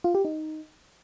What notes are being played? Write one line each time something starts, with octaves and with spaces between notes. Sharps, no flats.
F4
G4
D#4